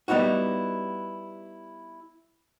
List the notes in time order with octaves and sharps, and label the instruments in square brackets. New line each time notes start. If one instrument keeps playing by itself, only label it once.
[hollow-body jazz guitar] G3 B3 D#4 E4 F#4